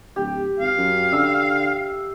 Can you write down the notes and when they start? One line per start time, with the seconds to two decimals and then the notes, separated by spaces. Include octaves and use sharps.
0.16 D1 G4
0.60 G#1 F5
0.77 F#2
1.12 D3 E5 E6